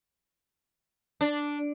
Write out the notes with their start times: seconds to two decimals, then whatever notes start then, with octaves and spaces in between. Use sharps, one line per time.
1.21 D4